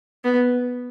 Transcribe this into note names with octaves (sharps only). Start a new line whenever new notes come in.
B3